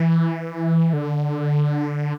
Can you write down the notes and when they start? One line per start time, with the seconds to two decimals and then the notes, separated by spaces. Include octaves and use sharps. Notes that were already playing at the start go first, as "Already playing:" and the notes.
Already playing: E3
0.93 D3